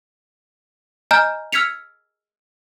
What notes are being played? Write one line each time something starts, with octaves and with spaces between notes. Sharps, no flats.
D#5 G#5 A#5 F6 G6
E6 F6 G#6 B6 C#7 F7